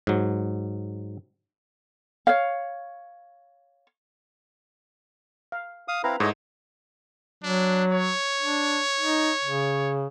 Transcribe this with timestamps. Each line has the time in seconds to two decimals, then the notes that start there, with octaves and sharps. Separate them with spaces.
0.07 G#2 F#3
2.27 C#5 F5
5.52 F5
5.88 F5 D#6
6.04 C4 E4 B4 F5 A#5
6.20 G#2 A3 E4 A4 C#5 D#5
7.44 F#3 D4
7.92 C#5
8.41 D4
8.99 D#4
9.44 C#3